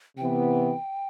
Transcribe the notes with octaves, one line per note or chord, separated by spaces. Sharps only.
C3 E3 B3 G5